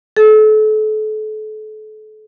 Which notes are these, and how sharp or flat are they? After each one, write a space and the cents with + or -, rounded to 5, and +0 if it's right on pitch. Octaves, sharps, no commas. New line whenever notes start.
A4 -35